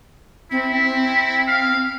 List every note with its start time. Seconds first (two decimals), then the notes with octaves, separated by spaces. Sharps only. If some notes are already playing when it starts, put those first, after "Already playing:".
0.52 C4 E4
0.84 C4
1.48 F5